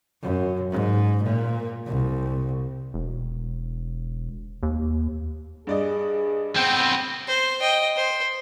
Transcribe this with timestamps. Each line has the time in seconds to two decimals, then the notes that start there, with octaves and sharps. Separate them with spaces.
0.22 F#2
0.71 G#2
1.22 A#2
1.86 C2
2.94 E1
4.63 D#2
5.67 G2 G#4 D5 D#5
6.56 B3 C4 G5 G6
7.27 C5
7.60 D#5 G5
7.96 C5